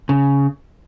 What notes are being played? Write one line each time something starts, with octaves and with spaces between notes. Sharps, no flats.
C#3